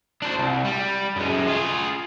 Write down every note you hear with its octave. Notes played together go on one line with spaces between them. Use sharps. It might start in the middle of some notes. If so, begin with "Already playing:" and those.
D4 C5
C2
G3
F#2 G#3
F4 G#4